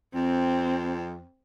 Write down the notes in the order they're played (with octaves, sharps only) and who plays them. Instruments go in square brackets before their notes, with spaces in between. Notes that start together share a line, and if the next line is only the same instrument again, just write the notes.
[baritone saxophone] F2 [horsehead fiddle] C4